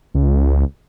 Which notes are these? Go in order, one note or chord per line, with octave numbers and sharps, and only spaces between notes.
C#2